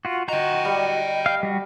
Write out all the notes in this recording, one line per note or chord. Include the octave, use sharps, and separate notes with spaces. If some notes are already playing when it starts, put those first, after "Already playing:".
F4 F#4
F#4 D#5 G5 A#5
G3
F5
G3 F#4